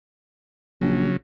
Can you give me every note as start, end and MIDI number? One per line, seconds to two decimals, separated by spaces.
0.81 1.09 34
0.81 1.17 49
0.81 1.17 54